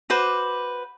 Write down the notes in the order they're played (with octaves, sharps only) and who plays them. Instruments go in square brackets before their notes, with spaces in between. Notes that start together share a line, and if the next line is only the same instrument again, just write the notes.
[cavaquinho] F#4 B4 C5 D6